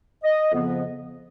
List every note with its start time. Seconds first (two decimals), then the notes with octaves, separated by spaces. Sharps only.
0.24 D#5
0.52 F2 C#3 F3 B3